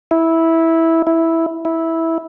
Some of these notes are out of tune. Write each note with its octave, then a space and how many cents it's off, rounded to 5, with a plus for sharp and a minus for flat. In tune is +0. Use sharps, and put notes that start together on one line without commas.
E4 -10
E4 -5
E4 -10